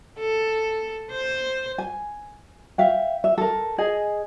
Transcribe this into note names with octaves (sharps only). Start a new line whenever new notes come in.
A4
C5
G#5
E5 F5 G5
E5
A4 A#4
G#4 D#5 G#5